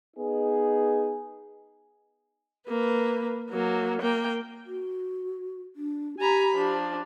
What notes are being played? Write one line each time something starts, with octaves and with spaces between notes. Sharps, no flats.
B3 D#4 G#4
A#3 B4
F#3 A#3
A#3 G5
F#4
D4
G4 G#5 A#5 B5
F3 D4